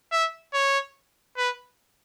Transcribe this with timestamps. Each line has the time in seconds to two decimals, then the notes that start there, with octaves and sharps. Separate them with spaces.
0.12 E5
0.54 C#5
1.37 B4